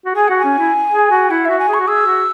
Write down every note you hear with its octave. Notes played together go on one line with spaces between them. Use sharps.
F#4
G#4 G#5
F#4 F#5
G#5
C#4
E4
G#4
F#4
E4 F#5
F#4 E5
G#5
G#4
C#6
F#4
G#4 E6
F#4